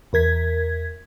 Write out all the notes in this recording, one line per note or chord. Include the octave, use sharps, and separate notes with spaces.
E2 A#4 G#6 B6